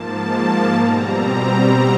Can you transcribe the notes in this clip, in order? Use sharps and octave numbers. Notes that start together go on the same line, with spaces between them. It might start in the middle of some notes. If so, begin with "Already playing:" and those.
Already playing: G#2 F3 A#3 A5
B2 G3 C4 A#5